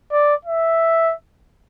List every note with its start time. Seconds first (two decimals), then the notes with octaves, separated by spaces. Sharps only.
0.12 D5
0.45 E5